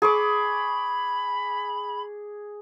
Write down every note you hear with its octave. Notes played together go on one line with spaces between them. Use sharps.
G#4 B5 C#6 D6